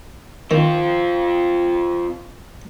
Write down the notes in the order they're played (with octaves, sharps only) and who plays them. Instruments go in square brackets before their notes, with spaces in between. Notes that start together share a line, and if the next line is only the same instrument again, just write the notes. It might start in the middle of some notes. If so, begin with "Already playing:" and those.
[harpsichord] D#3 [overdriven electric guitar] C4 F4